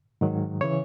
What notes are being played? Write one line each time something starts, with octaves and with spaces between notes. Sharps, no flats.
G#2 D#3 F#3
C#3 E3 C#5